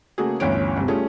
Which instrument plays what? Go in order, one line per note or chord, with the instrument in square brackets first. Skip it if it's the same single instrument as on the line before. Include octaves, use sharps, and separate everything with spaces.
[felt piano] C#3 A3 A#3 F#4 G#4
G1 D2 E3 C#4 C#5 D7
G1 C3
G3 A3 C#4 F4 G#4